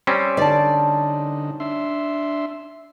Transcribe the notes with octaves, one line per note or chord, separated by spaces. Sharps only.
G3 C4 C#4
D3 D#4 D5 A5
D4 E5 C6